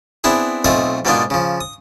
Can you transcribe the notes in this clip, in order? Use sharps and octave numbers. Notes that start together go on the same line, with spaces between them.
B3 C4 D4 E4 G#4
B1 A3 C4 F4 D#5 G#5
G#2 B2 A#3 B3 D4 F4
C#3 F3
D#6